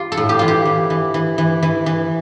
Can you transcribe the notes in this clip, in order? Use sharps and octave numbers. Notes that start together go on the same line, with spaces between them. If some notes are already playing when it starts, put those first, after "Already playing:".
Already playing: F4 G4
A4
A2
G4
E3 F4
G4
E3
E3
E3
E3
E3
E3